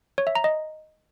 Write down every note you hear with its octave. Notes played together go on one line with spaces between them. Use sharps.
C#5
E5
A#5
D#5